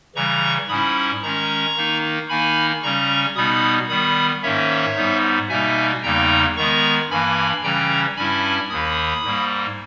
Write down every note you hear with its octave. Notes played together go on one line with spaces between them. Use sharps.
C#3 E3 G3 A#5 C#6
G#2 G3 C#4 E4 B5 D#6
D#3 G#3 C#4 A#5 C#6
D#3 A#3 D#4
D#3 A#3 D#4 G#5 B5
C#3 G3 C#4 A#5 C#6
B2 G3 B3 D#4 B5 D#6
D#3 G3 B3 B5 D#6
G#2 D#3 A#3 C#4 C#5 E5
G#2 G3 B3 D#4
B2 G3 A#3 D#4 E5 G#5
E2 C#3 G3 A#3 D#4 G5 A#5
D#3 G#3 B3 A#5 C#6
G2 E3 A#3 G#5 B5
C#3 E3 G3 C#4 G5 A#5
G2 G3 C#4 E4 G#5 B5
D#2 D#3 A#3 B5 D#6
G#2 G3 A#3